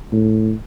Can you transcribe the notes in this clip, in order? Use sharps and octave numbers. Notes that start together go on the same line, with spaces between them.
A2